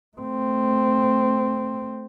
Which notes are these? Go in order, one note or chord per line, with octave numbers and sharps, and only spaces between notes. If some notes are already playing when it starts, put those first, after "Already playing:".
A3 C4